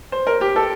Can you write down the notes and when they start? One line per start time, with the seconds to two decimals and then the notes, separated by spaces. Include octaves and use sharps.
0.12 C5
0.27 A#4
0.41 G4
0.56 A4